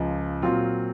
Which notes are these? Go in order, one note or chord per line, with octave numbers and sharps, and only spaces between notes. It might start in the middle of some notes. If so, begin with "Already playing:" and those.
Already playing: C#2 C#3 F3
A#2 F#3 C4 F4